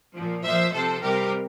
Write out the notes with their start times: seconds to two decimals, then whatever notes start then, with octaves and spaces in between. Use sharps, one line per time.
0.15 A#2 F3
0.44 A#2 F3 C5 E5
0.72 C3 F3 A4 C5
1.01 C3 G3 G4 A#4